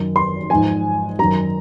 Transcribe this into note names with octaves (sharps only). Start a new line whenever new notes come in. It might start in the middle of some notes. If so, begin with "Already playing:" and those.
Already playing: F#2 D#3
C6
G#2 F3 G#5
F#2 D#3 A#5